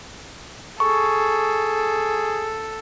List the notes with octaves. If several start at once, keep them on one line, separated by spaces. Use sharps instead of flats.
G#4 A4 C#6